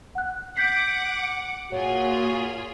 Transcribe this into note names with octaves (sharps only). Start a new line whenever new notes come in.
F#5 F#6
F#5 D6 G6 B6 C7
A#2 F4 F#4 G#4 C#5